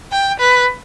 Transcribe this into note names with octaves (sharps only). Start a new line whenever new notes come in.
G5
B4